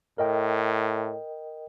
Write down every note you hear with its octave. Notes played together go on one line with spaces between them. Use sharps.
A2 A#4 D#5 G5